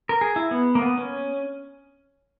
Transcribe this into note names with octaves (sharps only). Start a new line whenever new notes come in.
A#4
G#4
E4
B3
A#3
B3
C#4